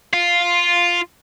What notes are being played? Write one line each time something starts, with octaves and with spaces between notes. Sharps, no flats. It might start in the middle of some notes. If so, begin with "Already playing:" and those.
F4